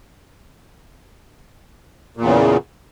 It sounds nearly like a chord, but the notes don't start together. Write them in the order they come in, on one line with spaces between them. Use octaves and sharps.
A#2 E2 C#3